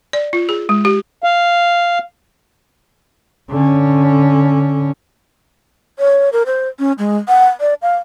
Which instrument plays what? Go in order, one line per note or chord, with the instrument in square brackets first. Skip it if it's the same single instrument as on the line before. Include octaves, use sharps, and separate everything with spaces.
[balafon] D5
F4
G#4
G#3
G4
[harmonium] F5
[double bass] D3 C#4
[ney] C#5
A#4
C5
C#4
G#3
F#5
D5
F5